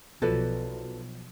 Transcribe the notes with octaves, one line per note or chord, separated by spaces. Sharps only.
B1 B2 F3 A4 B4 D5